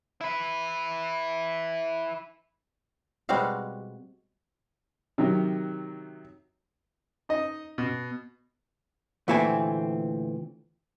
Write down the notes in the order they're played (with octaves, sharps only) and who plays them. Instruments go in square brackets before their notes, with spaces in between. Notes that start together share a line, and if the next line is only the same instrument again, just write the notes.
[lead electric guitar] E4 B4
[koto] B2 G3 G#3 C4 F#4 F5
[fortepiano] C3 D#3 F#3
D#4 D#5
B2
[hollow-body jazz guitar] D2 A#2 E3 A3 C4 G#5